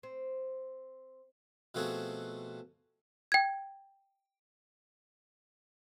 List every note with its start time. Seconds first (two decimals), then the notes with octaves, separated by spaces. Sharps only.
0.03 C4
1.75 B2 F3 A3 C4 F#4 G#4
3.32 G5 G#6